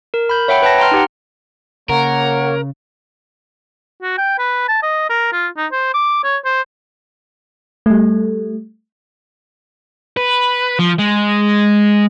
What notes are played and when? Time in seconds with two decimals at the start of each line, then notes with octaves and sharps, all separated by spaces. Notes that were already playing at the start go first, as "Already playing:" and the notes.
0.14 A#4
0.29 B5 G6
0.48 C#5 E5 F#5 G5 B5
0.62 B4 G5 A5 A#6
0.78 G5 A#5 C6 F6
0.91 D#4 G4 F#5
1.89 C#3 A#3 A#4 C#5 F#5
4.02 F#4
4.18 G5
4.39 B4
4.69 A5
4.83 D#5
5.10 A#4
5.32 F4
5.57 D#4
5.72 C5
5.94 D6
6.24 C#5
6.45 C5
7.86 G3 A3
10.17 B4
10.79 F3
10.99 G#3